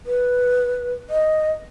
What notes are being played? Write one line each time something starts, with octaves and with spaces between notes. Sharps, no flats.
B4
D#5